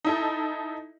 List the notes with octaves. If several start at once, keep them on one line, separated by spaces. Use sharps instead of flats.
D#4 E4 A4